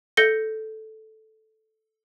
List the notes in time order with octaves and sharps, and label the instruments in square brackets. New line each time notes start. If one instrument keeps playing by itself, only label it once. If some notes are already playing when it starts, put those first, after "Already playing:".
[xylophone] A4 G6 A#6 C#7 G7